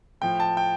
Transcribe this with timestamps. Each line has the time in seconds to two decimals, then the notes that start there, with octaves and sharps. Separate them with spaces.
0.21 A2 F3 G5
0.40 A5
0.57 G5